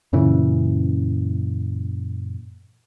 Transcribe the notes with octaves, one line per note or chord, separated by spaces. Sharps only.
F#2 A#2 C#3 E3